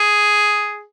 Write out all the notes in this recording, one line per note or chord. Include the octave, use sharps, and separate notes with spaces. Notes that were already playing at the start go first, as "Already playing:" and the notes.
Already playing: G#4